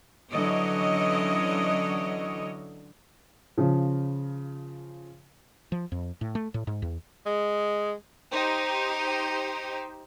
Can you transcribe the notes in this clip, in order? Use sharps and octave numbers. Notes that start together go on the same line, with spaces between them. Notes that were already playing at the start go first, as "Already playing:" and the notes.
D3 E3 F#3 C#4 C#5 D#5
C#3 F3
F3
F2
A2
A3
A2
G#2
E2
G#3
D#4 G4 C5